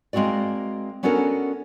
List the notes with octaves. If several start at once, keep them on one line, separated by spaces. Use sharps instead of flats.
G#3 A#3 C4 F#4 D5
B3 C#4 D4 F#4 A4 A#4